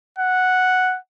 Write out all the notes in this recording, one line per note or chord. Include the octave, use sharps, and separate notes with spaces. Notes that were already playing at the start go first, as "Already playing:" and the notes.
F#5